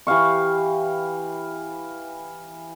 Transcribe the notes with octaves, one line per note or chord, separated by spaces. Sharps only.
E3 G4 F5 C#6